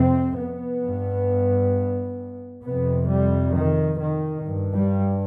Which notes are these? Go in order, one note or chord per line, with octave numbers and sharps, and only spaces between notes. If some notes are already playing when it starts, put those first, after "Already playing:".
Already playing: F2 C3 C4
B3
G2
F2 C3 B3
G3
D#3
D#3
G2
G3